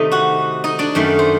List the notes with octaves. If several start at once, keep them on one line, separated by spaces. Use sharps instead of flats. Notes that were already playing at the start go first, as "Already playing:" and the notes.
Already playing: C3 D#3 A3 D#4 D#5
F#4 F#5
D#4 D#5
D4 D5
F#2 D#3 A3
C5